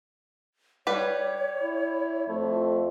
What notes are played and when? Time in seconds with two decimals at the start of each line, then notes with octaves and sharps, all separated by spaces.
0.87 G3 B4 C#5
1.62 E4
2.29 F2 A3